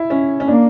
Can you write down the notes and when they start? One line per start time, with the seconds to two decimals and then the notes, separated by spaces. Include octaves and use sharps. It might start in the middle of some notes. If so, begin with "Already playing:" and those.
Already playing: E4
0.10 C#4
0.40 C#4
0.47 A#3 D4